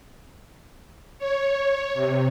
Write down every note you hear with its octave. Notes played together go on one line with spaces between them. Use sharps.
C#5
C3